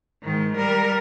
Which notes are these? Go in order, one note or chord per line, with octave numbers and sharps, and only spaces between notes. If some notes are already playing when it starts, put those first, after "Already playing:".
G#2 D#3
G3 A#4